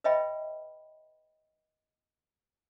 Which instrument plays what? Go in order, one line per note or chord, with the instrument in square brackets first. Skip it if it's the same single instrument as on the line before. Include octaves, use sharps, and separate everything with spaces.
[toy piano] B4 C#5 D#5 E5 G5 B5